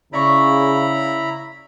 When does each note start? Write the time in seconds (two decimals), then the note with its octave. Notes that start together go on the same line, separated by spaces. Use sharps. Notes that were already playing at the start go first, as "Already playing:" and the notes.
0.13 C#3 E4 D5 A#5 B5 C#6